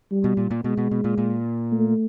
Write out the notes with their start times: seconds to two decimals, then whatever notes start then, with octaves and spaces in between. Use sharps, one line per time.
0.11 G3
0.24 B2
0.37 A#2
0.51 A#2
0.64 B2 G#3
0.77 B2
0.91 B2
1.04 A#2
1.18 A#2
1.72 A3